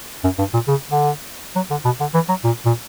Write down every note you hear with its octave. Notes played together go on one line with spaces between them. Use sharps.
F#2
G2
A#2
C#3
D3
F#3
D3
B2
D3
E3
F#3
A#2
A#2